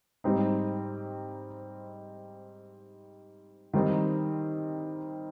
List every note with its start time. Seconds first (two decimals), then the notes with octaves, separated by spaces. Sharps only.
0.24 G#2 G3 C4 D#4
3.73 D#3 G3 C4 D#4